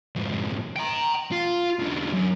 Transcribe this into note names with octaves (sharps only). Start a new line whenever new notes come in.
F2 G#2
G5 A#5
F4
E2 D3
F#2